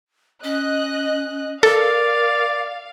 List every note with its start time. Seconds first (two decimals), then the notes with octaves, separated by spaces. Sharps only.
0.44 C#4 D#5 F#6
1.63 A4 A#4 D5 F5